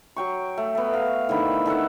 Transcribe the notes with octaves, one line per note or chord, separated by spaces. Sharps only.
F#3 G5 C#6
A3
A3 B3
F5
A2 D3 D#3 B5
D#3 A4 E5 F#5